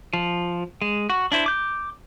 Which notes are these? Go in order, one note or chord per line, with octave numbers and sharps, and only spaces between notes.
F3
G#3
F#4
D4 E4 C5
D6 G6